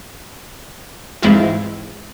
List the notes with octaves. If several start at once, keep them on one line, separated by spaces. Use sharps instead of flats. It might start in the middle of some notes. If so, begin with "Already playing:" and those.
G#2 E3 G#3 C4 E4 F4